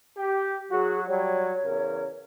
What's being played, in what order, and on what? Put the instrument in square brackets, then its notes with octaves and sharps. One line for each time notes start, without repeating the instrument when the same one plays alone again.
[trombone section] G4
[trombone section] F#3 F#4 [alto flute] G#4
[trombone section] F#3 G3 [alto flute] C#5
[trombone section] E2 C#3 A#4